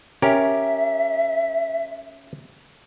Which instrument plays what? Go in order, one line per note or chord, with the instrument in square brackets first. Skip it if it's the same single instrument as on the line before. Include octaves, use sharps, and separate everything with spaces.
[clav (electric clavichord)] C#4 G4 A#4 [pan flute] E5